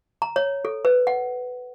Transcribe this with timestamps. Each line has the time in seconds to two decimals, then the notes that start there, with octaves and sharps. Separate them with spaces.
0.22 A#5
0.36 C#5
0.65 A4
0.85 B4
1.07 F#5